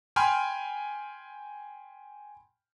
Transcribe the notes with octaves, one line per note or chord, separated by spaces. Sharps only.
G5 G#5 B5 C6 F6